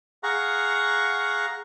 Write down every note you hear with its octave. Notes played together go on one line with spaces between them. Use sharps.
G#4 F5 F#5 A#5 C#6